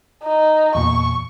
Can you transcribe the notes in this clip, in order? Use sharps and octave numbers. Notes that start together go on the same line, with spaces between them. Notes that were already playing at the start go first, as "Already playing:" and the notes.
D#4
E2 A#2 C#6